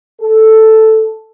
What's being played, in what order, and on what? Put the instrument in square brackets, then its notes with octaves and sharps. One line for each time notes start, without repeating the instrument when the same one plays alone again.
[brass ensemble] A4